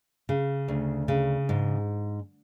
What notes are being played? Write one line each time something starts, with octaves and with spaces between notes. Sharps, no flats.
C#3
D2
C#3
G#2